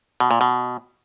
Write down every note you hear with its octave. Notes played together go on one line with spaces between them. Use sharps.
B2
A#2
B2